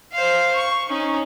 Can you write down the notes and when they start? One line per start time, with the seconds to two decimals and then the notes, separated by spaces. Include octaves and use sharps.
0.13 C5 F5
0.55 C#6
0.89 C#4 D#4